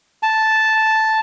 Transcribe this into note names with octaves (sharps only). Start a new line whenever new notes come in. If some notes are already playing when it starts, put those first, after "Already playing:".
A5